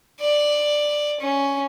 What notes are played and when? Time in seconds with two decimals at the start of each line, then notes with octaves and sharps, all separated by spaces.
0.20 D5
1.21 C#4